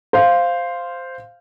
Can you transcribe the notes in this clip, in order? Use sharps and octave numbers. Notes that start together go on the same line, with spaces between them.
C5 F5